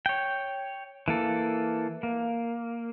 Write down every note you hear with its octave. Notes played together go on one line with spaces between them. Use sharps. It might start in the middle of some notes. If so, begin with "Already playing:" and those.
C#5 G5
E3 A#3 A4
A#3